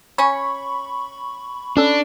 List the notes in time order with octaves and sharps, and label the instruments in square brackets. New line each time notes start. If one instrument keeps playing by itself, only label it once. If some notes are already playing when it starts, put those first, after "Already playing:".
[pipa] C#4 C#5 [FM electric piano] B5 C#6
[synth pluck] C#4 A4 [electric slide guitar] D4